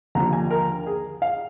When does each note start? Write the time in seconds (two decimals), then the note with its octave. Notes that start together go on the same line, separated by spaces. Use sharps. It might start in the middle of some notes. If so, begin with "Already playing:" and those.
0.15 D#2 D3 F3 A#5
0.33 G#5
0.51 A#4
0.86 G#4
1.22 F5